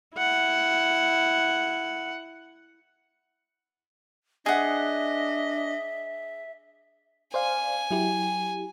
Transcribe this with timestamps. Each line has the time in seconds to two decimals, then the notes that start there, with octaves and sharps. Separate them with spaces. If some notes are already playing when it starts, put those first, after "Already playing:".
0.15 E4 F#5
4.46 D4 G#4 D#5 E5 F#5
7.34 C5 D5 F5 G#5
7.91 F#3 E4 G4